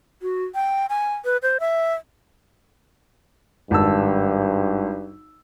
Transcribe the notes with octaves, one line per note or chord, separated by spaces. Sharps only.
F#4
G5
G#5
B4
C5
E5
G#1 G2 A5 E6